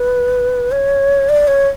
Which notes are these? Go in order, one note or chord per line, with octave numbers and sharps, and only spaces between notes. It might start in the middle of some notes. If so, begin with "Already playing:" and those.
Already playing: B4
C#5
D5
C#5